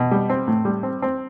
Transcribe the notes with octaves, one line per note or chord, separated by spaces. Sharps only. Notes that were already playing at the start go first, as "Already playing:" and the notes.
Already playing: B2
G3
C4
A2
G3
C4
C4